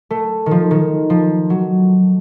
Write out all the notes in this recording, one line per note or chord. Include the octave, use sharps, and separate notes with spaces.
A3
D#3
F3
D#3
F3
F#3